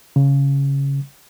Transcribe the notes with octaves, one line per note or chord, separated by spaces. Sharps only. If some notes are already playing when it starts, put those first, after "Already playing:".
C#3